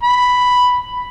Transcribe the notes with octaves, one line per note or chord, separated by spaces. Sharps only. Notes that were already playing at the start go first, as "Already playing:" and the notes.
B5